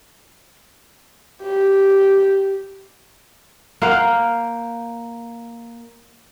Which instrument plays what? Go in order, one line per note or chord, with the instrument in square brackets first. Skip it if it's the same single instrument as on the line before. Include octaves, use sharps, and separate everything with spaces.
[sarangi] G4
[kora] A#3 C5 F5 F#5